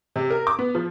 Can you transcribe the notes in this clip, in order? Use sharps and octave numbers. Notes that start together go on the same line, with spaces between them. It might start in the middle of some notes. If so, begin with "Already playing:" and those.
C3
A#4
D6
B3
F3